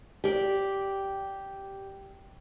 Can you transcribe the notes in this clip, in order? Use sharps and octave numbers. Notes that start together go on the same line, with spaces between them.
G4 D5